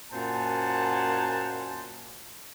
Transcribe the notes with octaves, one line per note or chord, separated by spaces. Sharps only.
F#2 A#2 C5 F#5 G#5 A5